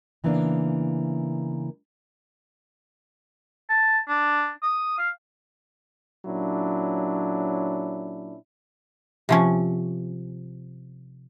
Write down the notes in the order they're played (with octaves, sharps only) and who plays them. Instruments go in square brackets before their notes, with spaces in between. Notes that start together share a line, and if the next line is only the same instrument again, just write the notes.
[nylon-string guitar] C#3 E3 A#3 B3 D4
[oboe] A5
D4
D#6
F5
[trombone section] A#2 F#3 C#4 D4 E4
[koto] C3 F3 C#4